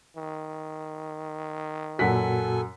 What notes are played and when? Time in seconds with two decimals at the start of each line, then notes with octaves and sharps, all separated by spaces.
0.17 D#3
1.99 F#2 A#2 F#4 A4 F#5 G#5 B6